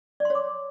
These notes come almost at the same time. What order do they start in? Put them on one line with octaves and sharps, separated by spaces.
D5 C6 C#5 D6